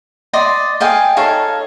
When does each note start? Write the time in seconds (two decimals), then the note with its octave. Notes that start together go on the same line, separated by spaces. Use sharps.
0.33 D5 D#5 C6
0.81 D#5 F5 G5 G#5
1.17 D#4 A4 C#5 F5